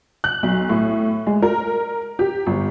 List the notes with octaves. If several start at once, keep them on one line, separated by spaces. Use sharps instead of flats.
F#6
B1
A2
G#3
A#4
G4
G1